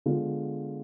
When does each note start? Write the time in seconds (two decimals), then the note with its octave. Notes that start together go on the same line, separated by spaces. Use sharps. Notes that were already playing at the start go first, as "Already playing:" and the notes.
0.06 D3 G#3 B3 F4